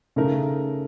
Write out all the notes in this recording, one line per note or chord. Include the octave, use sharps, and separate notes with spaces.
C#3 A3 D#4 A#4